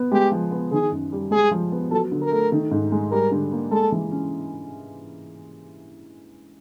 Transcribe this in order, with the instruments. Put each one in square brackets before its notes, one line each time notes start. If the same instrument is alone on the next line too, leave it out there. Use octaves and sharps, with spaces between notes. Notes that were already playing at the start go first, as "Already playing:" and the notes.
Already playing: [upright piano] B3
[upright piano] G#3 [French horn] G4
[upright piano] F3
B3
[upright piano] D#3 [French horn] G#4
[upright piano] F#2
G3
[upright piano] G#3 [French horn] G#4
[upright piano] F3
B3
[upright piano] F#3 [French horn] A4
[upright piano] D3
[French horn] A#4
[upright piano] A3
D#3
G#2
G#3
[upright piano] G3 [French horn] A#4
[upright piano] D3
A#3
[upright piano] G#3 [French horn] A4
[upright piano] E3
C#4